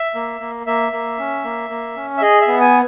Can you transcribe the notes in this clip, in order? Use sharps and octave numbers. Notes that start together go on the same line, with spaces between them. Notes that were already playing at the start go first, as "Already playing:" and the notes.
Already playing: E5
A#3
A#3
A#3 E5
A#3
C#4
A#3
A#3
C#4
E5
G#4 D#5
E5
B3
G#5